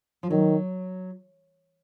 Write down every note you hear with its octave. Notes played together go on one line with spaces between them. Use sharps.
F3
D#3 F#3